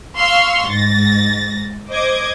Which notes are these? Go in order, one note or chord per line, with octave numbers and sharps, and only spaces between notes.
F5 C6 C#6 E6 F6
G#2 A6 A#6
C5 D#5 D6 G#6